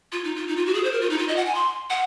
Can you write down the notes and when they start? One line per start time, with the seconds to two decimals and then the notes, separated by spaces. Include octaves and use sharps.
0.12 F4
0.24 D#4
0.36 F4
0.48 D#4
0.57 F4
0.66 F#4
0.74 G#4
0.84 C5
0.92 A#4
1.01 F4
1.10 D#4
1.18 F4
1.28 D#5
1.36 F#5
1.46 G#5
1.55 C6
1.90 F#5